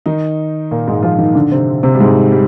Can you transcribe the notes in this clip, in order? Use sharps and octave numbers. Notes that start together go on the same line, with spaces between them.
D#3 D#4
A#2 A#3
G#2 G#3
F3 F4
D#3 D#4
D3 D4
C3 C4
C3 C4
G3
G#2 G#3
G3